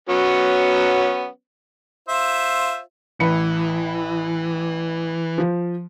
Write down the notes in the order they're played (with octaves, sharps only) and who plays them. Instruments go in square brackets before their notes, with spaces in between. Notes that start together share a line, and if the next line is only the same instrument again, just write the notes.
[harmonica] F#3 B3 C#4
F4 C5 E5
[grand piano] A1 B4 C#7 [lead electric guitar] E3
[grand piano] F3